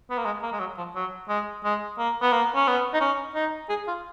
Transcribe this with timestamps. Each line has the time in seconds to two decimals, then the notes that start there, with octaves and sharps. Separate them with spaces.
0.10 B3
0.18 A#3
0.25 G#3
0.43 A#3
0.52 G#3
0.60 F#3
0.78 F3
0.95 F#3
1.28 G#3
1.64 G#3
1.98 A#3
2.22 B3
2.33 A#3
2.55 C#4
2.67 B3
2.94 D#4
3.00 C#4
3.35 D#4
3.69 G#4
3.87 F4